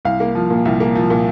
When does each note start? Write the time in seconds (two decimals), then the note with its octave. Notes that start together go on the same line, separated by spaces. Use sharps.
0.05 C2 F5
0.20 A#3
0.35 F3
0.50 A#2
0.65 C2
0.80 A#3
0.95 F3
1.10 A#2